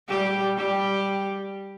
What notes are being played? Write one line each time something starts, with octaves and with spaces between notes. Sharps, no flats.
G3 G4
G3 G4